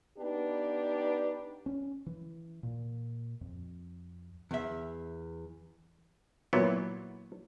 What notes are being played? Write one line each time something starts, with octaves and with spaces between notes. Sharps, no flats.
B3 D4 D#4 G4 B4
C#4
E3
A#2
F2
E2 E5
A#2 E3 F#3 B3